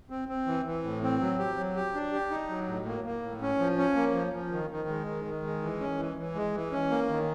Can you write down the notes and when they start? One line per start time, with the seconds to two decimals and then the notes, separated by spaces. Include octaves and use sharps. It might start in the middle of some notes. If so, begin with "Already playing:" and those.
0.10 C4
0.28 C4
0.47 E3
0.66 E3
0.84 A2
1.03 C4
1.20 F#3
1.39 G4
1.57 F#3
1.75 G4
1.94 D4
2.13 G4
2.31 D#4
2.49 F#3
2.67 A2
2.86 A#3
3.04 A#3
3.23 A2
3.41 C#4
3.59 F3
3.78 C#4
3.96 A#3
4.14 F3
4.33 F3
4.52 D#3
4.70 D#3
4.88 G#3
5.07 D#3
5.25 D#3
5.43 G#3
5.62 E3
5.81 C#4
5.98 E3
6.17 E3
6.35 G#3
6.54 E3
6.72 C#4
6.90 A#3
7.09 D#3